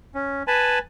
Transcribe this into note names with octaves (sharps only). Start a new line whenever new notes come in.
C#4
B4 G#5 A5 B5